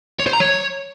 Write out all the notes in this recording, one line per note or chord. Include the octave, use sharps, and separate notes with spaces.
C#5
C5
A#5
C#5